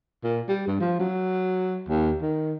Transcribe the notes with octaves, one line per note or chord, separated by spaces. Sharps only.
A#2
G3
G2
F3
F#3
D#2
D#3